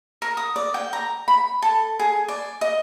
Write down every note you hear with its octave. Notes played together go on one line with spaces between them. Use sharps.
A#4
D#6
D5
G5
A#5
B5
A4
G#4
D5
D#5